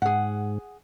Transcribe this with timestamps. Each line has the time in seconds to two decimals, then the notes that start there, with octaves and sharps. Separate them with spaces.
0.02 G#2 G#4 F#5